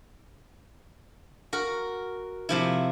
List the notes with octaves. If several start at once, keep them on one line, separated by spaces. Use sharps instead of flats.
F#4 A#4
C3 F3 E4